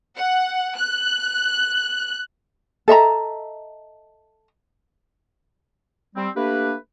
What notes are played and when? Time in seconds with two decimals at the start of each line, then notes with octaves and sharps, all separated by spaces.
0.16 F#5
0.77 F#6
2.88 A4 D#5 E5 A#5
6.15 G3 C4
6.36 A3 A#3 D4 G4 B4